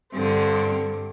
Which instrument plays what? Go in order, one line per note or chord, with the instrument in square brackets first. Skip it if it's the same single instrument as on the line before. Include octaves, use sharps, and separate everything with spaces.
[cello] G2 [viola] D3 C4